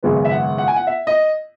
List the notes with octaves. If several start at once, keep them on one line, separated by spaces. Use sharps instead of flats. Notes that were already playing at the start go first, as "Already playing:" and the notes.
G#1 F#2 C#3 G#3 B3
E5
F#5
F#5
G#5
F#5
E5
D#5